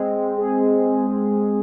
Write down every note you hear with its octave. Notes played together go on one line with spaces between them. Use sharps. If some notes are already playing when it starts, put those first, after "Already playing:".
Already playing: G#3 C4
G#3
G#4
G#3
G#3
C4
G#3